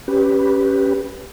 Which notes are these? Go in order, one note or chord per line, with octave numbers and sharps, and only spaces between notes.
C#4 G4 B4